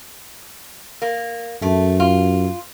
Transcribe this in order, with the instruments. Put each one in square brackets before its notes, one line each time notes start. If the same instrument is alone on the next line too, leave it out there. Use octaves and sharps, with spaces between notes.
[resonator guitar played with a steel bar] A#3
[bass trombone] F#2 [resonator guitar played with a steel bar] A3
[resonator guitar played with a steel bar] F4